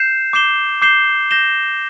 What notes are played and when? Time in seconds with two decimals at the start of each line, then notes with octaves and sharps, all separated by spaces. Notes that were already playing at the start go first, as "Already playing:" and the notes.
Already playing: G6 C7 E7
0.33 D6 G6 C7 E7 G7
0.82 D6 G6 C7 E7 G7
1.31 G6 A#6 E7 G7